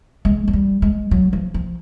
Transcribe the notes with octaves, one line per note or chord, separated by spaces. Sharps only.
G#3
F#3
G3
G#3
F#3
F3
F3